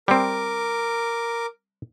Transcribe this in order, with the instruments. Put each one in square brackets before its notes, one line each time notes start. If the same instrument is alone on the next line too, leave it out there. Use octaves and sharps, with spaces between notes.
[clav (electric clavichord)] G3 C4 [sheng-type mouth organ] A#4 D6